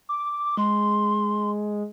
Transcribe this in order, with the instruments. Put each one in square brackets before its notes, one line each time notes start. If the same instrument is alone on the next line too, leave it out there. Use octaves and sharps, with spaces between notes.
[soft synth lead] D6
[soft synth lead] G#3 [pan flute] C6